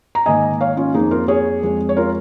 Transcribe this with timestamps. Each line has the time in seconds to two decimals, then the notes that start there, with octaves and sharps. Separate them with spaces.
0.15 A#5
0.26 G#2 D#3 A#3 D#5 G#5
0.61 C#5 F5
0.77 C#4 F4
0.94 F2 F3 A#3 D#4 G#4
1.11 F4 A#4
1.28 G#4 C#5
1.63 F2 F3 G#3
1.89 C#5
1.97 F4 A#4